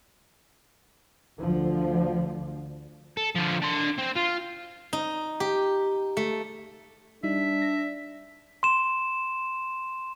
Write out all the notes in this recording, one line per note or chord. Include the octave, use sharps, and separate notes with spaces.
D2 D3 F3
A4
D3 F3
D4 C6
C4
F4
D#4
G4
A3
G3 D4 D#4 E5
A#6
C6 E7